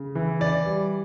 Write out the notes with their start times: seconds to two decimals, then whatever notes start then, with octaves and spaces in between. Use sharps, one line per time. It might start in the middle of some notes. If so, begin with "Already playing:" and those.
Already playing: C#3
0.15 E3
0.40 E3 D5
0.66 G3